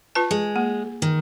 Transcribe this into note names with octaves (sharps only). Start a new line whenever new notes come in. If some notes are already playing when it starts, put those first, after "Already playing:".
F4 B4 A5
G#3
A#3
D#3